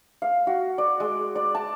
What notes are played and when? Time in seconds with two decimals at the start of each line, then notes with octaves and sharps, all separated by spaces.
0.22 F5
0.47 F#4
0.78 D5
1.00 G#3
1.35 D5
1.55 A5